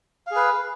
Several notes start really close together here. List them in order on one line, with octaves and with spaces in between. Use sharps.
F5 G#4 B4